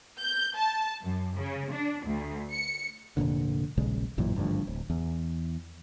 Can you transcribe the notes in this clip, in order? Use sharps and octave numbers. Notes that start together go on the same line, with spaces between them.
G6
A5
F#2
C#3
D4
D2
C#7
F1 A#1 A#2 D3
D#1 A#1 C#3 G#3
A1 F#2 A#2 E3
G#1 D2 G2 F3
D1
E2